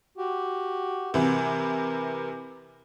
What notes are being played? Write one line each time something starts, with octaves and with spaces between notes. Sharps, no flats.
F#4 G4
C3 E3 A#4 B4